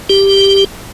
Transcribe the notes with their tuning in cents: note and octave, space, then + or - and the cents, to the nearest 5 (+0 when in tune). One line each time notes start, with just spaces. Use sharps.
G4 +5